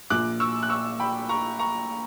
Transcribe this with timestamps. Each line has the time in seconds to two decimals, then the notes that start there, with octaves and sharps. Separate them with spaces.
0.10 A#1 A#2 D6 F#6
0.40 C#6 E6
0.63 F#6
0.70 C#6 E6
1.00 G5 B5
1.29 A#5 C#6
1.59 A#5 C#6